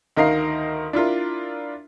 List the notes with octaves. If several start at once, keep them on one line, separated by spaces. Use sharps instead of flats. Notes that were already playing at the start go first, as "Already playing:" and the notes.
D2 D#3 A#4 D#5 F5 C7
D4 E4 F4 A#4